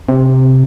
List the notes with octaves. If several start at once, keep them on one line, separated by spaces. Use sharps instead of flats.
C3